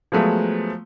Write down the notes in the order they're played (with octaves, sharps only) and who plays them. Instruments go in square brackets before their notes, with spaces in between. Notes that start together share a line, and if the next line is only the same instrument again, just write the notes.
[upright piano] F3 F#3 G#3 A3 B3